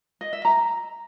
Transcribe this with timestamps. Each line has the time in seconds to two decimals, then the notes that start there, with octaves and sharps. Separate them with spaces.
0.21 D#5
0.33 E5
0.45 A#5